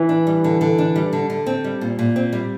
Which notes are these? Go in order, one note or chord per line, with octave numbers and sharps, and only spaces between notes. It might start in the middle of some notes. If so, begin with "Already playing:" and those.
Already playing: E3
D4
G3
D3
D3
D4
G3
D3
D3
C4
G3
A#2
A#2
C4
G3